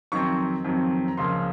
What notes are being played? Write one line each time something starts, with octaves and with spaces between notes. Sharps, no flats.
F2 D#3 F#3 C4 C#6
F2 D#3 F#3 C4
A#5
C#2 C#3 F3 A#3 C6